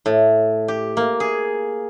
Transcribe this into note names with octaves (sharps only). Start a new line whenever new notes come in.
A2
G4
A#3
G#4